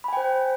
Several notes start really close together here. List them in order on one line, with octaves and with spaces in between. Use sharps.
B5 G#5 G5 C5